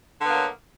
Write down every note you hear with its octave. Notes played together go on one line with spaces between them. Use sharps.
D3 F#3 A#3 B3